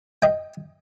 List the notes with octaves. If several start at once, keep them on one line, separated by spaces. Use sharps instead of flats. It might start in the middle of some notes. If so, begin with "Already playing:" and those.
D#5 G5